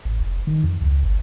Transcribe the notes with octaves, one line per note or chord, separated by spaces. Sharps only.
A1
F1
D#3
F2
C#2
G1